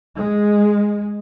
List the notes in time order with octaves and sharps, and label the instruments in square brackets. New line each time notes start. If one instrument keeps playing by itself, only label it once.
[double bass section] G#3